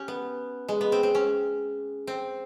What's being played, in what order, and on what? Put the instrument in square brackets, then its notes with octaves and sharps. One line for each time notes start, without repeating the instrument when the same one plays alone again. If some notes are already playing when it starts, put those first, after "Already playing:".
Already playing: [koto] C#4 G4
B3
G#3
B3
C4
C4
C#4
C4